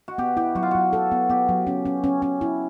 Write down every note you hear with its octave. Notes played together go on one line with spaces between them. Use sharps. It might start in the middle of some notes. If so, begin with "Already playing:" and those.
F#4
B3 G4
E4 G4
F#3 F#4
F4
F#3 F#4
A4
B3
B3 G4
F#3
C#4
C#4
C#4
C#4
E4